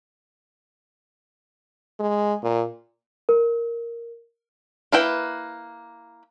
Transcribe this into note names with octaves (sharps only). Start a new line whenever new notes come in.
G#3
A#2
A#4
A#3 E4 B4 G5